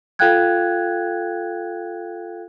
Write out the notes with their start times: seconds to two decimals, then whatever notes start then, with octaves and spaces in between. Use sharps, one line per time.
0.19 F4 A4 F5 G5 F#6 G#6